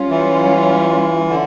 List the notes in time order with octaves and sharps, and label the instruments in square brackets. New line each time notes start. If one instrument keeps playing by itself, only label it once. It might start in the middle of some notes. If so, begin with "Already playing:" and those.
Already playing: [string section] G3 C#4 F4
[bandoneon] E3
D3